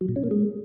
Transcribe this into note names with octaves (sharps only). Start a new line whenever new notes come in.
F#3
A#2
C#4
A#3
G#3